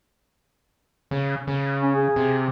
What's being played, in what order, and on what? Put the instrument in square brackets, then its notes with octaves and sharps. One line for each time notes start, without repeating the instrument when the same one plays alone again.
[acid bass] C#3
C#3
[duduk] C#4
G#4
[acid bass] C3